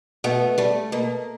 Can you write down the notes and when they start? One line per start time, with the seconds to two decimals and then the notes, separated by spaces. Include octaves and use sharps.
0.24 B2 A3 B3
0.58 G3 A3
0.92 B2 A#3